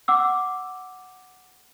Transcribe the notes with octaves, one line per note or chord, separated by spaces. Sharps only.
F#5 D6 E6